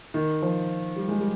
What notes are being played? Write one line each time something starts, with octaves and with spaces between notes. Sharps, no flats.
D#3
F3
G3
G#3
G3